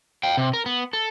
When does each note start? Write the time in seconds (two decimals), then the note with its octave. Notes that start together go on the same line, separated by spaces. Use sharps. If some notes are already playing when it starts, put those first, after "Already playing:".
0.23 F5 G5
0.37 C3
0.53 A#4
0.66 B3
0.93 A4